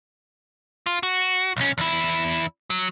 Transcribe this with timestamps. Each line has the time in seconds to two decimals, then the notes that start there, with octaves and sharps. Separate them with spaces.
0.86 F4
1.03 F#4
1.57 B1 C#4
1.78 E2 E4
2.70 F#3